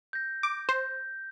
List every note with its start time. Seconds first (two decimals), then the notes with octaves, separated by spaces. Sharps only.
0.13 G6 A#6
0.43 D6
0.69 C5 G6